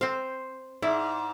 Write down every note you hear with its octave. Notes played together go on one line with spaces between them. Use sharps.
C4 C5 F5
G#2 E4 D5